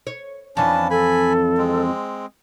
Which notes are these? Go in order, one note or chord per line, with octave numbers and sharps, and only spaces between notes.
C#5
F2 E3 C#4 D4 A5
A4 G#5 B5
G#3 C4